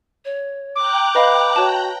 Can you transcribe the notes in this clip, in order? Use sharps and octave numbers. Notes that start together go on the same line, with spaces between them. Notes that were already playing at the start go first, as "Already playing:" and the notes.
C#5
G5 A#5 D6 F#6
B4 D#5 F5 B5
F#4 C#5 A5